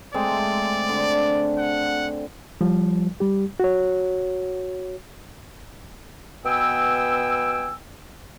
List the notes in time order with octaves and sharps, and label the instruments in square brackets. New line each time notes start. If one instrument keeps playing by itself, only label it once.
[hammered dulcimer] G#3 A3 C4 [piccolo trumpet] D5
[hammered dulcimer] D3
[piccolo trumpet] F#5
[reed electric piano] F3 G3
G3 G4
F#4 C#5
[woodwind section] B2 B3 G5 G#5 E6